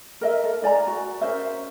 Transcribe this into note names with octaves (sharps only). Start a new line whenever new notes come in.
A#4 D#5 E5
A4 A#4
E4 D5 G#5 A#5
F#4
C#4 A#4 C5 E5